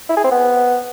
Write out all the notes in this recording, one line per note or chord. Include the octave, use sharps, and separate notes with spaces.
E4
G#4
C4
B3